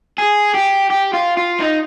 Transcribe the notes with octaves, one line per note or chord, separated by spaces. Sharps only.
G#4
G4
G4
F4
F4
D#4